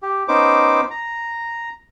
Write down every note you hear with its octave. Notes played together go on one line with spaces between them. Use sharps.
G4
B3 C#4 D#4 C5 D6
A#5